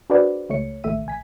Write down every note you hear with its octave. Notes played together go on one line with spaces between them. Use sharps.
D4 F#4 G#4 B4 C5 D5
C#2 A3 C#5 C#7
A1 D#2 A3 E5 D#7
A#1 G#5 B6